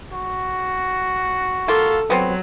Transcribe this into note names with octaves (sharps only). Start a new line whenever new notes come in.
F#4
A#3 F4 A4
F#3 B3 C4